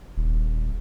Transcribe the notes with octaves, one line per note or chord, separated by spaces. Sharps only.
D#1